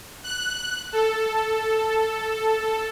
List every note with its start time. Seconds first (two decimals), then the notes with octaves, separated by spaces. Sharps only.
0.24 F#6
0.92 A4